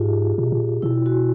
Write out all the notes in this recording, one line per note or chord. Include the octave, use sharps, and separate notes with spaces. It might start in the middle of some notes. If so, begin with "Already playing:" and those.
Already playing: G#2 F4 G4 G#4
A#2
B2
A#2
B2 E4
F#4